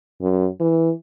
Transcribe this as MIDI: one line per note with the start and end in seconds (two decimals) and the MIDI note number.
0.21 0.46 42
0.60 0.91 52